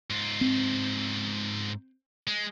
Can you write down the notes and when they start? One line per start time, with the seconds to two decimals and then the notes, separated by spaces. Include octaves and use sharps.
0.10 G#2 F4
0.41 C4
2.27 G#3